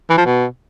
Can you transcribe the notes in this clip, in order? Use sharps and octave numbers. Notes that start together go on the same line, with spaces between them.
E3
F3
B2